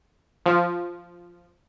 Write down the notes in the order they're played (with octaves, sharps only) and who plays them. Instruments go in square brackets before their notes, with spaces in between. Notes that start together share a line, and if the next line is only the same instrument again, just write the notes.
[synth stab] F3